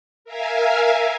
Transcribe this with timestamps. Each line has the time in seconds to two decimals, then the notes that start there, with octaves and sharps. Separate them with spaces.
0.25 A#4 E5 F5 G#5